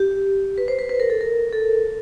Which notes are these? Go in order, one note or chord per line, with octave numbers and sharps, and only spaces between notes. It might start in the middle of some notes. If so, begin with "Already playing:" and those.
Already playing: G4
B4
C5
B4
B4
A#4
A4
A#4
A4